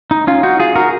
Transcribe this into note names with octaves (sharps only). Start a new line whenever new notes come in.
D#4
C#4 F4
D#4 F#4
F4 G#4
F#4 A#4